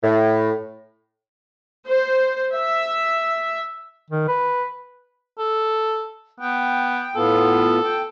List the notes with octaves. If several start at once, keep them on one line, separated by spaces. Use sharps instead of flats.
A2
C5
E5
D#3
B4
A4
B3 G5
A2 B3 F4 A4
G5